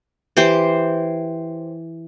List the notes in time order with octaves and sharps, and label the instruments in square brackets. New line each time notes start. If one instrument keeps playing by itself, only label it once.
[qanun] E3 G4 C5